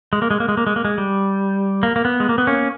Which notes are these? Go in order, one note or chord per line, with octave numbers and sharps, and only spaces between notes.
G#3
A#3
G#3
A#3
G#3
A#3
G#3
A#3
G#3
G3
A#3
A#3
B3
G#3
A#3
B3
A#3 C#4